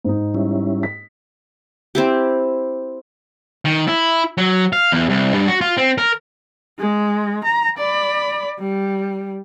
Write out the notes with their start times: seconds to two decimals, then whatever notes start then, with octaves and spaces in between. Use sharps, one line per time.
0.04 G#2 D#4
0.34 G3 C#4 E4
0.83 B6
1.95 C4 E4 G4
3.65 D#3
3.88 E4
4.37 F#3
4.73 F5
4.92 E2
5.09 C2
5.34 G2
5.48 F#4
5.61 F4
5.77 C4
5.98 A#4
6.79 G#3
7.44 A#5
7.78 D5 B5
8.59 G3